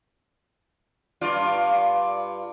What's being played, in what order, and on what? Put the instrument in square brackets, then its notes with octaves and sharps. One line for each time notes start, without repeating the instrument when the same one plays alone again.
[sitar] G2 F4 D5